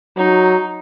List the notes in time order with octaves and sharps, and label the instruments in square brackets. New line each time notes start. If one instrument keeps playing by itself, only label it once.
[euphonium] F#3 [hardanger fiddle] D#4